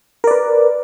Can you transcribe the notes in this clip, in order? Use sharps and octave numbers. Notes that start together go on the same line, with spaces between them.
A#4 B4 D5